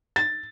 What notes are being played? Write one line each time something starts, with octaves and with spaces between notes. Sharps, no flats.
A6